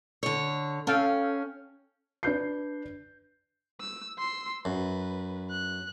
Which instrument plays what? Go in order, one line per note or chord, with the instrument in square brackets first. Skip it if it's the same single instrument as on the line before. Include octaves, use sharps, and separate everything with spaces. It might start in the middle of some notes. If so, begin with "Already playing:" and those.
[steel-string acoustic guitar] D3 C#5
[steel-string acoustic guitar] C#4 [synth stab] A4 F5 G5
[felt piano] D4 B4 G6 C7
[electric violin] E6
C6 E6
[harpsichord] F#2 [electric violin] B4
[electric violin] F#6